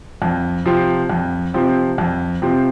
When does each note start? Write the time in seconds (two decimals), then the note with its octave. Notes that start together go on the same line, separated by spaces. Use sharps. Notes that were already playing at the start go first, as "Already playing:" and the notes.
0.22 F2
0.65 C3 F3 C4
1.10 F2
1.54 C3 F3 C4
1.98 F2
2.42 C3 F3 C4